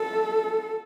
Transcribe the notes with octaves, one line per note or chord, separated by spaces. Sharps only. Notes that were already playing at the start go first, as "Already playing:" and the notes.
Already playing: A4